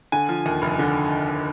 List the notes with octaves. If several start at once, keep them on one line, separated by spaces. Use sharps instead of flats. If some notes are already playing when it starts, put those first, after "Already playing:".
D3 G#5
F3
D#2
F1
D3